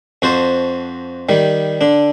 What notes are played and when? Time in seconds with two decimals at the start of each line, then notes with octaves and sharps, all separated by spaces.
0.22 F2 F#4 C5 A5
1.29 D#3 G3
1.81 D3 D4